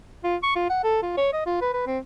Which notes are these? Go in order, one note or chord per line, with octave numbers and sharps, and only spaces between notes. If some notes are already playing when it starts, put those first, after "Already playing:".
F4
C#6
F4
F#5
A4
F4
C#5
D#5
F4
B4
B4
C4